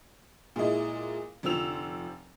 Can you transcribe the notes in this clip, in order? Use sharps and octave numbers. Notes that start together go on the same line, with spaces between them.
A#2 G#3 E4 D#5
F1 D3 F3 E6 F7